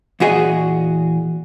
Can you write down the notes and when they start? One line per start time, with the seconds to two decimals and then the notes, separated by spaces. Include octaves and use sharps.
0.20 E2 A#2 F#4 G#4 D#5